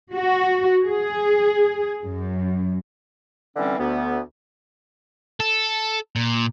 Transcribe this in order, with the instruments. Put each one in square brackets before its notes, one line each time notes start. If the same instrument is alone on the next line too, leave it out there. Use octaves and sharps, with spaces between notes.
[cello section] F#4
G#4
F#2
[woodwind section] D3 E3 G3 C4 C#4
D2 B3
[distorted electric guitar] A4
A#2